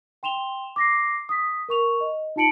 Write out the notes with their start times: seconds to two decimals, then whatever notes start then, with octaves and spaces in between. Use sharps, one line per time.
0.23 G5 C6 E7 F7 G7
0.76 D6 A#6 C7
1.29 D#6 B6
1.69 A#4 C#6 F7
2.01 D#5
2.36 D#4 F4 A5 C#7 D7 F#7